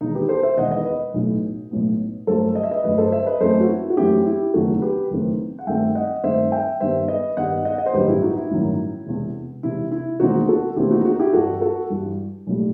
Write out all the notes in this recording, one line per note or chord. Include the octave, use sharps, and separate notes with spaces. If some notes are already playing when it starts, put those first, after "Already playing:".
E1 E2 D#3 D#4
G4 B4
A4 C5
C5 E5
E1 E2 D#3 D#5 F#5
B4 D#5
B4 D#5
B1 A2 E3 B3
B1 A2 E3 B3
G1 G2 F#3 A3 A4 C5
D#5
E5
B4 D#5
G1 G2 F#3 A3 B4 D#5
A4 C5
C5 E5
B4 D#5
F#2 E3 A3 C4 A4 C5
F#4
E4
F#4
F#2 E3 A3 C4 E4 G4
E4 G4
F#1 E2 D#3 A3 C4 F#4 A4
G4 B4
F#1 E2 D#3 A3 C4
F#5
G2 D#3 A3 C4 E5 G5
D#5 F#5
G2 D#3 A3 C4 C5 E5
E5 G5
G2 D#3 G3 B3 C5 E5
B4 D#5
G2 D#3 G3 B3 D#5 F#5
D#5 F#5
D#5
C5
A1 G2 D#3 F#3 G4 B4
E4 G4
D#4 F#4
E4
A1 G2 D#3 F#3 E4
E1 E2 C3
E1 E2 C3 E4
E4
E1 D#2 D#3 A3 C4 D#4 F#4
F#4 A4
E1 D#2 D#3 A3 C4 E4 G4
D#4 F#4
D#4 F#4
E4 G4
G2 E3 G3 F#4 A4
F#4 A4
G2 E3 G3
B1 A2 G3